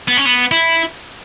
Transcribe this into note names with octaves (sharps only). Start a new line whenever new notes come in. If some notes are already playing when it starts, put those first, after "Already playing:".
B3
C#4
B3
E4